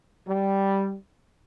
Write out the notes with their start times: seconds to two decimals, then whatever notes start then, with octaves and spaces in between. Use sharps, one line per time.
0.27 G3